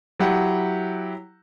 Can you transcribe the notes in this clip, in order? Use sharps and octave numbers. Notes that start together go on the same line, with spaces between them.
F#3 E4 G4 F#5